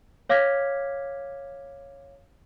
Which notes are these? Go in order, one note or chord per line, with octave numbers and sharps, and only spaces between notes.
C#5 F5 D6 F6 G#6 B6